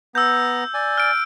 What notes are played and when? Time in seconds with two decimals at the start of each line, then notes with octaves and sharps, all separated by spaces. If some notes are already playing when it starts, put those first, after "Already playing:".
0.15 B3 A#5 E6 G6
0.74 D5 G#5
0.98 F6 D7